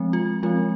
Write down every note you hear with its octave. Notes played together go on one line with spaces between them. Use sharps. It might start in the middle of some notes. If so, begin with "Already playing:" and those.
Already playing: F3 G#3 C4
F4
F3 G#3 C4 F4